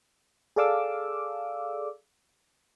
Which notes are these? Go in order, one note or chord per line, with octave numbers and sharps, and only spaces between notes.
G#4 A4 D5 F5 D6 E6